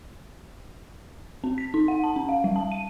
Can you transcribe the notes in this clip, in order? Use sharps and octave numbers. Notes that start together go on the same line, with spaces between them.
C4
B6
D#4
F#5
A5
C#4
F5
G3
A5
D#7